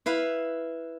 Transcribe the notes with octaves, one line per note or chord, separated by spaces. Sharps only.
E4 B4 F5